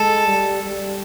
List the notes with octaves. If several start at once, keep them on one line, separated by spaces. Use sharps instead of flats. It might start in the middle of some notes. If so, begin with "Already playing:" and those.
Already playing: G#3 A4
G3
G3